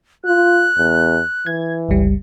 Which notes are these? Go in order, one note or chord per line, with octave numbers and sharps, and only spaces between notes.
F4 F#6
E2
E3 G#6
G1 C#2 G3